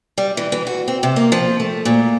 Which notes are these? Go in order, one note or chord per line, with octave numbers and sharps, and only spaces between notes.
G3
E3
E3
F#4
C4
C3
A#3
F3
A3
A#2